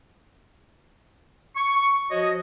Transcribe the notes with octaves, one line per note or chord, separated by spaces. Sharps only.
C#6
F3 F#4 C#5 D#5